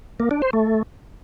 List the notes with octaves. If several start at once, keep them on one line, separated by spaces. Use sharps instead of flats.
A#3
D4
C5
A3